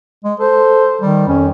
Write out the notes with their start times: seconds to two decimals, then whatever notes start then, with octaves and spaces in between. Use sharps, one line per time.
0.24 G#3
0.40 A4 C5
1.01 D#3 G3
1.28 F2 C#4